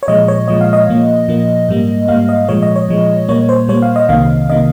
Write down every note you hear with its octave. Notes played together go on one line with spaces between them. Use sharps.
C#5
A#2 F3 G#3 D#5
C#5
A#2 F3 G#3 D#5
F5
D#5
A#2 F3 A#3
A#2 F3 A#3
G#2 G3 A#3
G#2 G3 A#3 F5
D#5
A#2 F3 G#3 C#5
D#5
C#5
A#2 F3 G#3
A#2 G3 A#3 C#5
C5
A#2 G3 A#3 C#5
F5
D#5
C2 C3 D#3 A#3 F5
C3 D#3 A#3 D#5